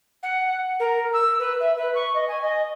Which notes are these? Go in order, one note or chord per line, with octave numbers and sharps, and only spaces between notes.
F#5
A#4
E6
B4
E5
B4
C#6
D#5
G#5
D#5